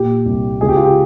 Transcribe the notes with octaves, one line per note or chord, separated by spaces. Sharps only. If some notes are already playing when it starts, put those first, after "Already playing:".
Already playing: A#2 G4
C2
C#2 G#4
G4
F4
G4